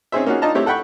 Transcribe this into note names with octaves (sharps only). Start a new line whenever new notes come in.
C4 C#4 D#4 G#4 C5 E5
A#3 C#4 D#4 F4 F#4 G#4
D4 D#4 F4 D#5 A5 A#5
A3 C4 E4 G4 C#5
A4 F#5 G5 B5 C#6